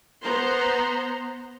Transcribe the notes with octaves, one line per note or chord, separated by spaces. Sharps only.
B3 C5 A#5 C6